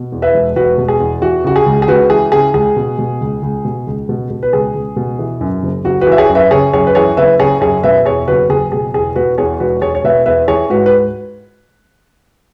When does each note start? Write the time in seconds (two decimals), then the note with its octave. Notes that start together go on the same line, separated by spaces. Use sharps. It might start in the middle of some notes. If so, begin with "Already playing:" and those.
Already playing: B2
0.12 E2
0.22 B4 E5
0.34 E1
0.56 E1 F#4 B4
0.78 B2
0.88 G#4
1.00 E2
1.22 E3 F#4
1.44 C#3 F#4
1.56 G#4
1.66 C#2
1.82 G#4
1.88 C#2 F#4 B4
2.10 E3 G#4
2.32 C#3 G#4
2.54 C#2 G#4
2.77 B2
2.99 B2
3.21 C#2
3.43 C#2
3.65 B2
3.87 C#2
4.09 B2
4.30 B2
4.43 B4
4.53 C#2 G#4
4.75 C#2
4.96 B2
5.19 E3
5.41 F#2
5.63 F#1
5.85 F#1 F#4
6.01 F#4 B4
6.07 E3
6.12 E5
6.18 G#4 C#5
6.29 F#2
6.35 B4 E5
6.51 C#3 G#4 C#5
6.73 F#2 G#4 C#5
6.87 B4
6.95 E3 G#4 C#5
7.17 F#1 B4 E5
7.39 C#3 G#4 C#5
7.61 F#2 G#4 C#5
7.83 B2 B4 E5
8.05 E2 G#4 C#5
8.28 F#1 F#4 B4
8.49 F#1 G#4
8.72 B2 G#4
8.94 E2 G#4
9.16 B2 F#4 B4
9.38 E2 G#4 C#5
9.60 E1 F#4 B4
9.82 E1 G#4 C#5
9.95 C#5
10.04 B2 B4 E5
10.26 E2 B4 E5
10.48 E3 G#4 C#5
10.70 G#2 F#4 B4
10.86 B4